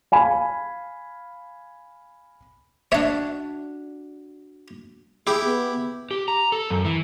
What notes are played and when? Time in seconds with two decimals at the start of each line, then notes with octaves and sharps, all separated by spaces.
0.12 F5 G#5 B5
2.92 D4 F#4 C#5 E5
5.27 E4 G4 G#4
5.45 B3
6.11 G4
6.28 A#5
6.52 A4
6.70 F#2
6.85 E3